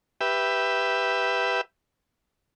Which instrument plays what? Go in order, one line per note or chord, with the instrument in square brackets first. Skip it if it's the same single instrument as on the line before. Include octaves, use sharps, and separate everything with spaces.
[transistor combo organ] G4 B4 E5